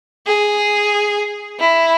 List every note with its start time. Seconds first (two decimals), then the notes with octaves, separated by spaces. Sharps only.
0.26 G#4
1.59 E4